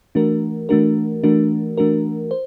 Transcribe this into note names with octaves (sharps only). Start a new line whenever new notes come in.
E3 A3 D4 F#4 A#4
E3 A3 D4 F#4 A#4
E3 A3 D4 F#4 A#4
E3 A3 D4 F#4 A#4
C5